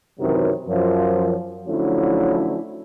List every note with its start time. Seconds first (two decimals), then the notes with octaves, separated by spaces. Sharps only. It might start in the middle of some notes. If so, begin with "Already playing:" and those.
0.20 F#2 C3 D#3 E3 F#3
0.68 F#2 F3
1.67 D3 F3 F#3 A3 C#4 E4